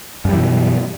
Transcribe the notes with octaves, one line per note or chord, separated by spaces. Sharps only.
F#2 B2 E3 G3